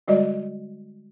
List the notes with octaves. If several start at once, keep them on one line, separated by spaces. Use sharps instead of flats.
D3 G3 G#3 F#4 D5 D#5